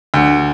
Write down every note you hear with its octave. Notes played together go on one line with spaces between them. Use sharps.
D2